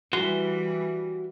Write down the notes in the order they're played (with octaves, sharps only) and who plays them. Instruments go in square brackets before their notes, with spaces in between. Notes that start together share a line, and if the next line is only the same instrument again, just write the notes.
[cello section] E3 G3 [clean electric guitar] F#4 C6